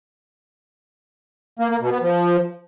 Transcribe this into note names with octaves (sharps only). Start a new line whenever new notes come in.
A#3
A#3
B2
B3
F3